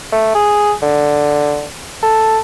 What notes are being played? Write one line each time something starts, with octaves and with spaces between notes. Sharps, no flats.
A3
G#4
D3
A4